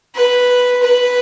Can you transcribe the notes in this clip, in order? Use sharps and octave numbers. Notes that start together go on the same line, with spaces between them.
B4
B4